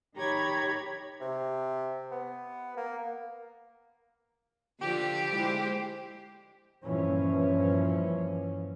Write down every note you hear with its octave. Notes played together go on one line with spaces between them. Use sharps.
D#3 G4 C#5 A#5 B5 G#6
C3
B3
A#3
D3 F3 G4
G#3 E4 C5
G2 A#2 E3 F3 C#4